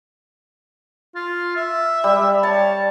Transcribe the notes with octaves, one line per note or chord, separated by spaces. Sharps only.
F4
E5
G3
C#5 A5